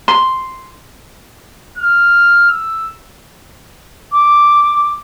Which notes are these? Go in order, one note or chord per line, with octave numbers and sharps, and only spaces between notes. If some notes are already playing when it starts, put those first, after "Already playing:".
C6
F6
E6
D6